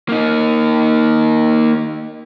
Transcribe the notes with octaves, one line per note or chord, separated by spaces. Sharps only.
A#3 D#4